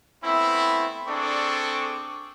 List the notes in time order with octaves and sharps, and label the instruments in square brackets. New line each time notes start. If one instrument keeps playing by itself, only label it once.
[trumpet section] A3 B3 C4 E4
C4 D4 G#4 A4 D5 C#6